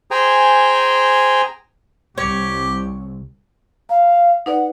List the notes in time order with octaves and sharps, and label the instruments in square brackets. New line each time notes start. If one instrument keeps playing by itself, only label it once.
[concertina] G#4 C5 G5 G#5 A#5
[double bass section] C2 [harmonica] G4 [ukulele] C#5
[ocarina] F5 [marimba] A#5
[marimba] D#4 B4 D5 [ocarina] F#5